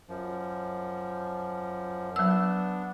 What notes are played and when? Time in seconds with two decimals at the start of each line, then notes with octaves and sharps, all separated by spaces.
0.09 F#2 F3
2.16 F#3 B3 D4 E6